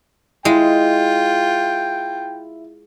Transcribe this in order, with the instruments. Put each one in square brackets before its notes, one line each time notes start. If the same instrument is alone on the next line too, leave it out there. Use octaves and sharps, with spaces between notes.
[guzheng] G#3 [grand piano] E4 [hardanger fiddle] F4 [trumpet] G5